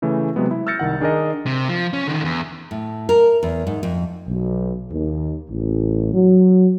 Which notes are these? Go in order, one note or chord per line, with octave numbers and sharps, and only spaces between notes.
C#3 E3 A3
C3 F#3 G#3 B3
E4
E6 F6 G6 A6 A#6 C#7
C2 D#3 F#5
D#3 D4 G#4 A#4 D#5
C3
F3
C#4
D3 D#3
E2
A2
A#4
E2
G#2
F2
B1
D#2
A1
F#3